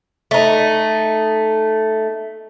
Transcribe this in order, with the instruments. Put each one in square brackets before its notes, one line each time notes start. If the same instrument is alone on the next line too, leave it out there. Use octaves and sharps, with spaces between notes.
[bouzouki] A3 D#4